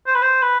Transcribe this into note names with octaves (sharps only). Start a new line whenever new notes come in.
C5
B4
C5
B4